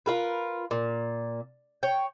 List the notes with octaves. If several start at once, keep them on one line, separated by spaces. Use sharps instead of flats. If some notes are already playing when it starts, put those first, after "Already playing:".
F4 A#4 B4
A#2
C#5 G5